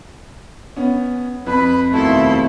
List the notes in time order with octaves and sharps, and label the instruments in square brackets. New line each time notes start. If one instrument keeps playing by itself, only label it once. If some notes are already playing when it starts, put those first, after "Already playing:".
[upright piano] B3 C#4
[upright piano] F2 [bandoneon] B4 [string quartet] B5
[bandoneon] D#2 B2 A3 [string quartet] E4 A4 C6